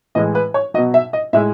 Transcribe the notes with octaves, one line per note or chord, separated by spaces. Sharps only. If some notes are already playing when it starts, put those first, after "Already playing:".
A2 E3 G#3 D#5
B4
C#5
B2 F#3 D#5
E5
D#5
A2 G#3 E5